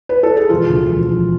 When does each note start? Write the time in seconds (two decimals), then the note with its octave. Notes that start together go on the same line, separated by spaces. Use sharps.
0.09 B4
0.23 A4
0.37 G#4
0.49 E1 F4
0.70 D2
0.89 E1
1.09 F3